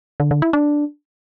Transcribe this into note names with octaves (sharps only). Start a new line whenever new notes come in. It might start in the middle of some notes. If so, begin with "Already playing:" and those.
D3
D3
E4
D4